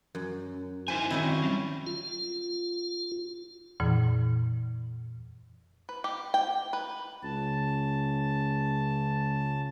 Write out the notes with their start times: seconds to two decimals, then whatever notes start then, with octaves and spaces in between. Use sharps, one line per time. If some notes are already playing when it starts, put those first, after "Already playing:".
0.15 F#2
0.88 D#4 E4 C5 G#5
1.10 D#3 C4 C#4 D#4 E4
1.42 F#3 G3
1.87 F4
3.80 F2 A#2 E3
5.89 B4
6.04 G4
6.34 G5
6.73 B4
7.23 C#2 C#3 A5